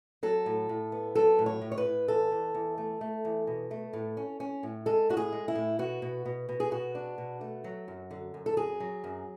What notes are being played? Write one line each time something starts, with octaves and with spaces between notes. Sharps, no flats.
F#3 A4
A2
A2
B3
F#3 A4
A2
C#5
A2
C#5
B4
A2
E2 A4
E2
E2
A3
A3
E2
B2
A3
A2
C#4
C#4
A2
G#3 A4
A2 F#4
G#4
G#3
E4
A2
B2 F#4
B2
B2
B2
G#4
B2 F#4
D4
B2
A3
F#3
F#2
D3
F#2
A4
F#3 G#4
F#3
F#2